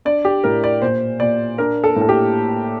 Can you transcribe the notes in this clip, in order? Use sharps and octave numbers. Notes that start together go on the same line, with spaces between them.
D4 D5
G4
A2 A#4
D5
A#2 C5
A#2 D5
D4 A#4
A4
A2
A4
G4